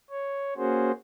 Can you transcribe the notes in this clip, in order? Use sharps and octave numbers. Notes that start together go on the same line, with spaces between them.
C#5
A#3 C#4 F#4 G#4 C5